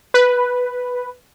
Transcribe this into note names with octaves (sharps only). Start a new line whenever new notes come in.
B4